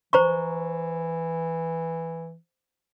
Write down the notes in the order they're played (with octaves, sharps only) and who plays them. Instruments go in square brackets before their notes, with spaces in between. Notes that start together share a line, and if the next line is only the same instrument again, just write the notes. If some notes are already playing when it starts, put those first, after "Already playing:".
[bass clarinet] E3 [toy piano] C5 A#5 C#6